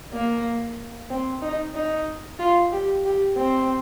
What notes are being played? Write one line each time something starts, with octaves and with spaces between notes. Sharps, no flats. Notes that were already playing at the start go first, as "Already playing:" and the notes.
A#3
C4
D#4
D#4
F4
G4
G4
C4